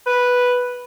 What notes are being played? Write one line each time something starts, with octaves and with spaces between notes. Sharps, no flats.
B4